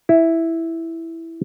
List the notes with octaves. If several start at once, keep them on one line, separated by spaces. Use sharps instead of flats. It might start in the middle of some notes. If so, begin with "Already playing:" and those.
E4